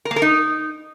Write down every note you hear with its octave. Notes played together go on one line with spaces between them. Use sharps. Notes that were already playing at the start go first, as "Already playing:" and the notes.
A#4
A#3
A#4
D#4